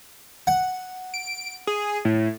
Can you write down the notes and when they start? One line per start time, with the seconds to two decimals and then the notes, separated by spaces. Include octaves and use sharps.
0.47 F#5
1.14 D7
1.67 G#4
2.05 A2